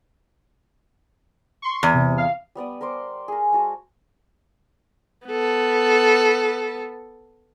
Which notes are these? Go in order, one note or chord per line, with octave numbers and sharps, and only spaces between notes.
C6 C#6
E2
C3
F5
G3 B3 D5 D#6
A#4 C5 C6 D6
G#4 A#4
G#3 F#4 A5
B3 A4